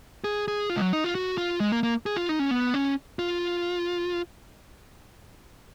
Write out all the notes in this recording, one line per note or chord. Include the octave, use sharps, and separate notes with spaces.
G#4
G#4
F4
G#3
F#3
D#4
F4
F#4
F4
G#3
A#3
A#3
G#4
F4
D#4
C#4
B3
C#4
F4